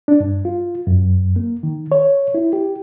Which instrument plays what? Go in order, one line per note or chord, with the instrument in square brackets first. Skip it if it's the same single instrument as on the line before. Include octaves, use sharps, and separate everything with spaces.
[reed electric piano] D4
G2
F4
F#2
A#3
D#3
C#5
E4
G4